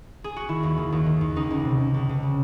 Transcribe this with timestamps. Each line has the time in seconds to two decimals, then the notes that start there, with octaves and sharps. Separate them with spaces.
0.24 G#4
0.36 F#4
0.48 D#3 E4
0.63 D#2
0.78 D#3
0.92 D#2
1.06 D#3
1.21 D#2
1.36 C#2 D#4
1.51 C#2
1.65 C3
1.80 C#2
1.94 C#2
2.09 C#2
2.23 C#3